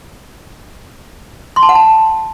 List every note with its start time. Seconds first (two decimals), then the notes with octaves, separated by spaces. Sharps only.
1.56 C6
1.63 A5
1.69 F#5
1.75 A5